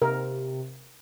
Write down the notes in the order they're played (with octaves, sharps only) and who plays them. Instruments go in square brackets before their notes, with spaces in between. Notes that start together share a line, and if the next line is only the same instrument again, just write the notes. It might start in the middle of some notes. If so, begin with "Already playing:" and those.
[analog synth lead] C3 [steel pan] A#4